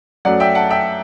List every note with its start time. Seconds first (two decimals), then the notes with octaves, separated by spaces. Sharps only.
0.25 F#2 F#3 A3 D5 F#5
0.40 E5 G5
0.55 F#5 A5
0.70 E5 G5